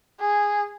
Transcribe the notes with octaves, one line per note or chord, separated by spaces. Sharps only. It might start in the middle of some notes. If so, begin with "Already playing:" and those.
G#4